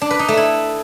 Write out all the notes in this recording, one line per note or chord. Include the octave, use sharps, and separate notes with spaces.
D4
B4
D#4
A3
E4